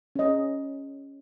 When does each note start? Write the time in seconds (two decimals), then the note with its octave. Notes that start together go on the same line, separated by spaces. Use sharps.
0.16 C#4 D#5